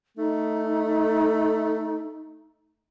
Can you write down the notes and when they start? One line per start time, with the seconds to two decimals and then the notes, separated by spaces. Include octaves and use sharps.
0.17 A3 D#4